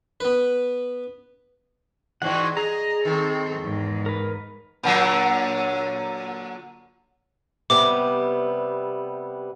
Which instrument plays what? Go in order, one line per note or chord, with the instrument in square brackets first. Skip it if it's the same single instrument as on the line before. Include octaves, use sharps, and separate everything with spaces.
[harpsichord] B3 B4
[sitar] E2 G#2 E3 [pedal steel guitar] F#4 F#5
[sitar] G#4 [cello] D#5 [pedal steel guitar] A#5
[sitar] D#3 [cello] C4 A4
[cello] E2 G#2
[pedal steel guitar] A#4 B4
[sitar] A#2 D3 F#3
[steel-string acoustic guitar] C3 G3 B3 [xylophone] D6